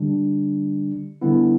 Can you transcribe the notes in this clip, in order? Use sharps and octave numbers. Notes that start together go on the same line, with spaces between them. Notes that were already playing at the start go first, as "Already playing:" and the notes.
Already playing: D3 G3 D4
D3 G3 B3 E4